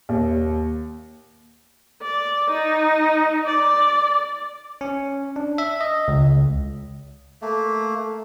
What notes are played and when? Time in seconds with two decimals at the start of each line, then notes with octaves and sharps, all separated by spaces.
0.09 D#2
2.02 D5
2.51 D#4
3.46 D5
4.81 C#4
5.36 D4
5.58 E5
5.81 D#5
6.08 C#2
7.42 A3 A#3